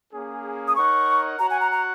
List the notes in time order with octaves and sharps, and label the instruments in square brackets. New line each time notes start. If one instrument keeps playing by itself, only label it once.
[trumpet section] A#3 C#4 G#4
[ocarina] D#6
[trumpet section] D#4 A#4 C#5 F#5 [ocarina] C#6
[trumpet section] F#4 C#5 F#5 [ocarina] A#5
[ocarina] G#5
A#5
A#5